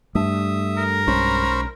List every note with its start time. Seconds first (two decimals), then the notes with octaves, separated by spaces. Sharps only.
0.15 G2 A3 E5 D#6
0.77 A#4
1.07 B1 G#3 C#4 C5 B5 C#6